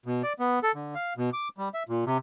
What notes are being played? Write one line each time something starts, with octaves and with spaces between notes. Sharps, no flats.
B2
D5
B3
A4
D3
F5
B2
D6
G3
E5
A#2
C3